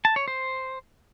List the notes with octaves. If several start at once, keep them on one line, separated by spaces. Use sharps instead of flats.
A5
C#5
C5